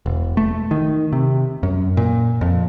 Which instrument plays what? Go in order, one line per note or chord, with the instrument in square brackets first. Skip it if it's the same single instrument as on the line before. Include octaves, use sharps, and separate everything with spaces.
[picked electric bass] E1
A3
D#3
C3
F#2
A#2
F2